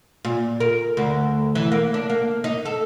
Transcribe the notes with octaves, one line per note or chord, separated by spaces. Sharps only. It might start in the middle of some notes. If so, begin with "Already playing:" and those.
A#2
A#4
D2
E3
A#3
D4
A#3
D#4
A4